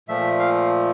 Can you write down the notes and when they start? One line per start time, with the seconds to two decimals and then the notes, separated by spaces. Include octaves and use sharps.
0.08 A#2 F3 A3 E5
0.39 F5